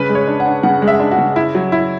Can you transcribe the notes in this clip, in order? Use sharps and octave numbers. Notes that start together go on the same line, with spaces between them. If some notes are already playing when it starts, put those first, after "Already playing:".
Already playing: C#3 B4
G#3
C#5
D4
F#5
D4
C#3 F#5
G#3
E5
D4
F#4
C#3
E4
F#3
E4